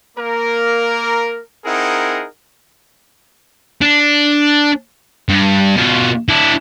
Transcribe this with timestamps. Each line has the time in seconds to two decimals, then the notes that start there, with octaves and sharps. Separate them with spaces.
0.17 A#3 A#4
1.65 C4 D#4 E4 G#4 A#4 F#5
3.81 D4
5.29 G2
5.77 B2 F4
6.29 D4 E4